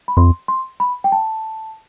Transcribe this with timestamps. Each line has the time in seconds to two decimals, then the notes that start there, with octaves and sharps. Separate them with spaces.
0.08 B5
0.17 F2 C6
0.48 C6
0.80 B5
1.04 G5
1.12 A5